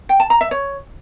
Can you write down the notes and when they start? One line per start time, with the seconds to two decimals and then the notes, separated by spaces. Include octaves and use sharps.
0.09 G5
0.20 A5
0.30 A#5
0.41 E5
0.51 C#5